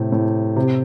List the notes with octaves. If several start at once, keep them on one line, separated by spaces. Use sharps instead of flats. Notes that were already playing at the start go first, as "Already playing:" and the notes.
Already playing: A2 C3
A2
C3